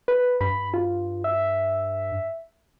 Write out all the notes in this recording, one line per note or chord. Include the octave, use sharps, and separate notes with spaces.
B4
G2 B5
F4
E5